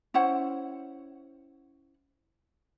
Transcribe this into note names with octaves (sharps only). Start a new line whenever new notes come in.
C#4 E4 C5 F#5